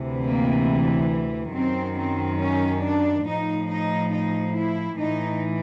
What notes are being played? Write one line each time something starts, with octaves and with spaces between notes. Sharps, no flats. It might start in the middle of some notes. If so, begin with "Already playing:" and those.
Already playing: D2 C3 E3
A#3
F#2 D#3 C4
C4
C#4
D4
A2 F3 D#4
D#4
D#4
E4
A2 E3 D#4